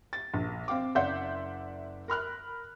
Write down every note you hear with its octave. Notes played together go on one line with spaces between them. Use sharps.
A6
A#1
C4 F5 G5 D6
F#1 D5 E5 F#5 C6 G6
A#4 B5 F6 F#6